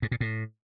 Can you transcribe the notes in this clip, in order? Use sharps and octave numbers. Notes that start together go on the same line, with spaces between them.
G#2
A#2
A2